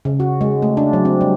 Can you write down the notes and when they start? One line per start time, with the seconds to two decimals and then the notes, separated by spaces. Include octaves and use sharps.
0.05 C#3
0.20 F#4
0.41 G#3
0.62 A3
0.77 D4
0.93 F#3
1.05 C4
1.21 G3